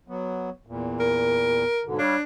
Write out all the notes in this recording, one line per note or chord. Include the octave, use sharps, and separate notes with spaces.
F#3 B3
E2 A#2
A#4
G#2 B2 D3
G3 D4 C#5 F5